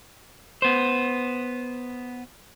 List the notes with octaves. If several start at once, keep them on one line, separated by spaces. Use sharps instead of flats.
B3 C5